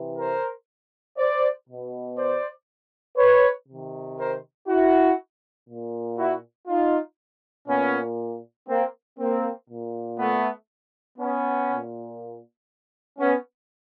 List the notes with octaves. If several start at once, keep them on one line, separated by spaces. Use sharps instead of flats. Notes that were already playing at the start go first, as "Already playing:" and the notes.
Already playing: C3 E3
A#4 C5
C5 D5
B2
C5 D5
B4 C#5
C3 D#3
A#4 C5
E4 F#4
A#2
E4 F#4
D#4 F4
A#2 B3 C#4
A#3 C4
A#3 C4
A#2
A3 B3
B3 C#4
A#2
B3 C#4